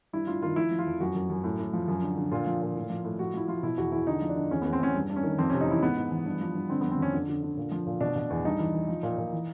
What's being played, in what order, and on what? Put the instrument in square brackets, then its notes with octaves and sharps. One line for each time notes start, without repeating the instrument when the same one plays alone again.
[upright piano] G2 E4
G2 F4
D#3 F4
F3 E4
F3
F4
F2
F#2 F#4
F#2
F#2
A2
A2
F3
F#2
D3
D3
A#2 F4
F3
A#2
A2
F3
A2
F3 F#4
F3 E4
F3 F4
B2 E4
E2 F#4
E2 E4
D3 D#4
F3
D4
D3
E2 C#4
E2 B3
C4
E2 C#4
G2
G2
C#4
D#3
F2 C4
C3 C#4
D#4
E3 E4
G#2 B3
G#2
E3
G2
F3
G2
D3 C4
F2 B3
C4
F2 C#4
D3
D3
D3
A#2
F3
A#2
B2 D4
B2
E2
G2 D#4
E3
E3
F3
A#2
A#2
E3